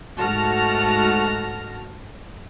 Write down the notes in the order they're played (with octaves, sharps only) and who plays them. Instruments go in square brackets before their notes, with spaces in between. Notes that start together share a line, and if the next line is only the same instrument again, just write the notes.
[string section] G#2 A3 F#4 A5 F6 A#6